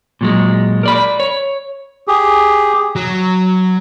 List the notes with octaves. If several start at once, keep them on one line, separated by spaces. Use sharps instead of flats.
A#2 F#3 G#3
A#4 D5 B5
C#5
G4 G#4
F#3